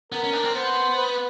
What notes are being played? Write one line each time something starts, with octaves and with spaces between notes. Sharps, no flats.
B3 A#4
C#4
D4
C4
B3 C5
B4